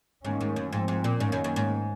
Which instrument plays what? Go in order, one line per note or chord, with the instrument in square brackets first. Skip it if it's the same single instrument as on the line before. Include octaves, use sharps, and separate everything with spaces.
[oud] G#2 [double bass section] D#3 A#3 C#4
[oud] G#2
F#2
[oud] G#2 [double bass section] F3 C4
[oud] G#2
A#2
[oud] G#2 [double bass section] D#3 A#3 C#4
[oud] F#2
F#2
G#2